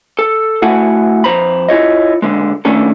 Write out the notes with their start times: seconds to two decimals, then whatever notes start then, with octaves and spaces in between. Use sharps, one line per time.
0.19 A4
0.62 A3 E4 F#4 F#5 G#5 A5
1.24 F2 E3 C5 A#5 B5
1.68 E4 F4 C#5 D#5
2.22 C#2 A#2 D3 G#3
2.65 D#3 A3 C#4 D4 A4